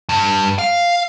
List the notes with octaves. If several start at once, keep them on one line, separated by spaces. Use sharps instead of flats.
G2
F5